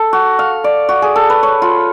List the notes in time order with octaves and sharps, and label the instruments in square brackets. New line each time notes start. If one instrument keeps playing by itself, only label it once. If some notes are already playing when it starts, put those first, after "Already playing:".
Already playing: [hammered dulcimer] A4
F#4
F5
D5
F#4
G#4
A4
B4
C#5
F4